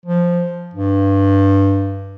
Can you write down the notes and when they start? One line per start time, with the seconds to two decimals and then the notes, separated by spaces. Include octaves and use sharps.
0.06 F3
0.74 G2